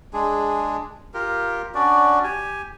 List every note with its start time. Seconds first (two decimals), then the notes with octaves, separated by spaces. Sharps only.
0.13 G#3 D4 G#4
1.14 F4 G4 A#4
1.75 C#4 D4 F#4 D5
2.24 G4 G#5